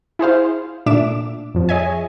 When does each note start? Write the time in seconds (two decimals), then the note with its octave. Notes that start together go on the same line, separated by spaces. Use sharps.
0.19 E4 G#4 C5 F5
0.86 A#2 A3 D4 E5 D6 E7
1.55 F2 F3
1.69 G#4 C#5 D#5 E5 G#5